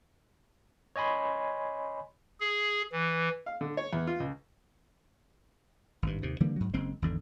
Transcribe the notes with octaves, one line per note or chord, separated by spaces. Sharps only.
C#5 D#5 G#5 B5 C6
G#4
E3
F5
D3
C#5
E2
F4
C#2
G#1 G2
D#2 C3
D3 E3 G3 A#3
G#2 F#3
F#1 G#3 C4
G#1 E2 D3